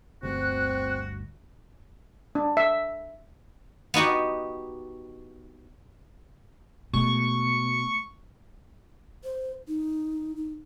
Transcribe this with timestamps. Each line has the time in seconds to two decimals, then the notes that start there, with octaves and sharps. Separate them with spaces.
0.23 G1 D2 G2 C4 F#4 F#6
2.35 D4
2.57 E5
3.94 B3 D#4 F#4 G4
6.94 B2 G#3 A3 C#6
9.24 C5
9.68 D#4
10.36 D#4